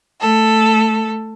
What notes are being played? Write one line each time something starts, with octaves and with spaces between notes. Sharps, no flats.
A3 A4